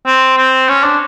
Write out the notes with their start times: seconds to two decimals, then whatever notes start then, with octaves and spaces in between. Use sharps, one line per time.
0.06 C4
0.37 C4
0.69 C#4
0.83 D4